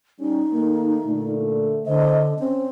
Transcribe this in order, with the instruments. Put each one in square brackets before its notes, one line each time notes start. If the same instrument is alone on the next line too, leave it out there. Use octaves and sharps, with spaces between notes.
[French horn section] G3 C#4 [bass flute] D#4
[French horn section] D#3 A3 A#3
A#2 D3 A3
[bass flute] D3 [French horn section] C5 D#5
[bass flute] C4 [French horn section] C#4